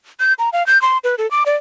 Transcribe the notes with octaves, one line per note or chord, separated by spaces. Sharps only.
G6
A#5
F5
G6
C6
B4
A4
D6
D5